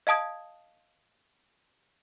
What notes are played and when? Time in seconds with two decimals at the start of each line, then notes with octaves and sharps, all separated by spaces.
0.07 D#5 F5 A5 D#6 G#6